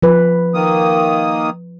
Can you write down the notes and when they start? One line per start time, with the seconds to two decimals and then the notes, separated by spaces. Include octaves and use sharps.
0.03 F3 B4
0.54 D#3 A#3 D#6